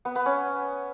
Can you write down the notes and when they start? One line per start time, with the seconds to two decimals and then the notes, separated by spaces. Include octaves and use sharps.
0.05 B3
0.15 B3
0.26 C#4